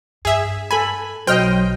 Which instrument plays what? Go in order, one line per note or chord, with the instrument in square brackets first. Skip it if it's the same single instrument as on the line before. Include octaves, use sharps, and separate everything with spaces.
[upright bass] G2 [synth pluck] G#4 E5
[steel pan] A4 B5 [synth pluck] G#5
[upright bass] B1 [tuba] F#3 [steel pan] C5 D#5 [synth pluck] G5 F6